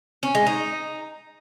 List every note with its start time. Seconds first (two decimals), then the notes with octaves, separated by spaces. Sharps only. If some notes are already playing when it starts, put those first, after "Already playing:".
0.23 C#4
0.35 G#3
0.47 D#4